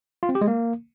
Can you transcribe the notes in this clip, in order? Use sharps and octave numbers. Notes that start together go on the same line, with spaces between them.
F4
C4
G4
G#3
A#3